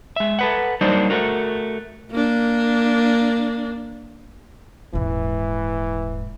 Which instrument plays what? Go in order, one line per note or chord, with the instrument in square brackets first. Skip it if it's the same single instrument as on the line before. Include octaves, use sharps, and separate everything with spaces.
[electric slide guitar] G#3 E5
A4 B4 F#5
F#3 G3 A#3 D4 D#4 C5
A3 F#4 A#4
[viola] A#3 D4
[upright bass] D#1 G#2 [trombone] E3